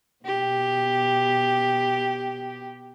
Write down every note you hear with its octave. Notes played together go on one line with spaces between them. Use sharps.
B2 G4